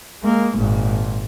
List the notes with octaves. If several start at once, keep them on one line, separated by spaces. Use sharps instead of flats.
G#3 A#3
G#1 A#2